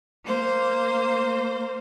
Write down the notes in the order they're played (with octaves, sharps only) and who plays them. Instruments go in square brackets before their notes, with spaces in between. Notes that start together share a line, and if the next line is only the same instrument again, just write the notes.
[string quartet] A#3 C5